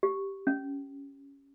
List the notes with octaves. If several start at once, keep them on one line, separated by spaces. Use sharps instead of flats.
G4
C#4